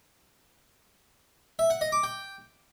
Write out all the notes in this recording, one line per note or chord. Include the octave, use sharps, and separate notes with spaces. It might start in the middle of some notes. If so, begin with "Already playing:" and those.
E5
F#5
D#5
D6
G5